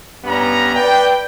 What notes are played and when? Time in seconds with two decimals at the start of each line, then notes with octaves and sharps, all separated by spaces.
0.25 G2 B3 C#4 A#5
0.75 B4 D5 G5